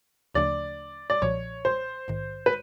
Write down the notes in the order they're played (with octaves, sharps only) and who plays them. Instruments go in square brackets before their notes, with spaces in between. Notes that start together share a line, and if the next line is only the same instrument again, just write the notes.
[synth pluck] D2 C#3 F3 A3 D4 [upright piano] D5
[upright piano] D5
[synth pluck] B1 A#2 F3 [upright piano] C#5
[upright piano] C5
[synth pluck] A#1 G#2 D#3
[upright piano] B4